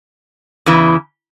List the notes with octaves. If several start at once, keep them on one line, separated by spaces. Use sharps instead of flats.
E2 C#3 E3